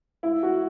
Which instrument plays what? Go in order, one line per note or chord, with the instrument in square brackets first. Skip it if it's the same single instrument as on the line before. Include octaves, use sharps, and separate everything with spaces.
[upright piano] E4
F#4